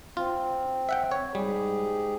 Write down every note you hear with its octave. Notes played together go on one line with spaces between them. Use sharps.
C4 F4
E5 F#5 G5
C#5
G#2 G3 G4 G#4